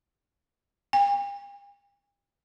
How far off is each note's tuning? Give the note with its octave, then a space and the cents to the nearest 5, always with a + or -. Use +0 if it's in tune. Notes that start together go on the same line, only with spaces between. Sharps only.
G5 +45